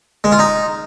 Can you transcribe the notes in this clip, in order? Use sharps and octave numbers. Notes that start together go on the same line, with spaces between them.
G#3
F4
D#4